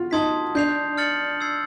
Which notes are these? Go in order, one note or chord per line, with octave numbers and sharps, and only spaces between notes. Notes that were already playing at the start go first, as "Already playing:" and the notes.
Already playing: F4 F#4
D#4 A5 C6 D#6 G#6 B6
D4 G6 C7 F7
F6 A6 C#7 F#7
E6 G#6 C7